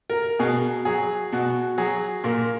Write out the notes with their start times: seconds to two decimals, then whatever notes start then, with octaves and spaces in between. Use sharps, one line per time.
0.10 A#4
0.39 B2 G#4
0.85 F#3 G#4
1.32 B2 F#4
1.78 F#3 G#4
2.24 A#2 A#4